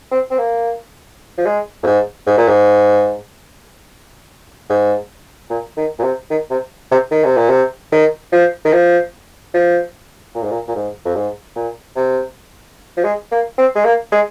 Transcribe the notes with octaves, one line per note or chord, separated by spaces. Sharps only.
C4
C4
A#3
F3
G#3
F2
G#2
G#2
A#2
G#2
G#2
A#2
D#3
A#2
C3
D#3
C3
C3
D#3
C3
A#2
C3
D#3
F3
D#3
F3
F3
A#2
G#2
A#2
A#2
G#2
F2
G#2
A#2
C3
F3
G#3
A#3
C4
G#3
A#3
G#3